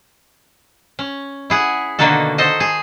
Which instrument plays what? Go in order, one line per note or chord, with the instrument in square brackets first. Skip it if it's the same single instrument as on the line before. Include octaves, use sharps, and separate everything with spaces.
[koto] C#4
E4 G#4 F#5
B2 D3 D#3 A#3 F#4 A4
A4 C5 D#5
G#4